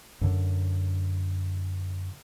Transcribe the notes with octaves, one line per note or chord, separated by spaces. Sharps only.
F#2 D3